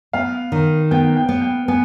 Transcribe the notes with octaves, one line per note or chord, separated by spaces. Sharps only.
B3 F5
D#3
B3 G5
G5
B3
G5
B3 G#5